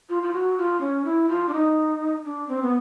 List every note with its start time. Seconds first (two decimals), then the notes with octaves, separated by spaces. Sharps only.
0.09 F4
0.23 F4
0.33 F#4
0.58 F4
0.81 C#4
1.05 E4
1.29 F4
1.49 D4
1.53 D#4
2.25 D4
2.48 C4
2.62 B3